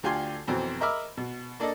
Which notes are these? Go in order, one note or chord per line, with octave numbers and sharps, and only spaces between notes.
D2 D3 F4 G4 G#5 C6
F2 B2 E3 F#3 C4
A#4 D#5 E5 B5 D6 F6
B2
A#3 D4 A4 D#5